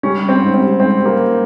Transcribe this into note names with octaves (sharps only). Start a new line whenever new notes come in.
G3 C#4
G3
C4
G#2
C4
G3
G#2 C4
G3
A#3
G3